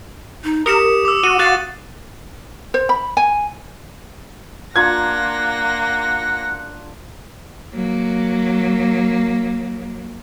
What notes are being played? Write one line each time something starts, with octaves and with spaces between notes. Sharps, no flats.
D#4
G4 A#4 D#6 C#7 E7
D6 E6
F#4 D#7
F#4 F5 F#6 A6
C5
B5
G#5
A#3 D4 F4 F#5 A#5 G#6 A#6
F#3 A#3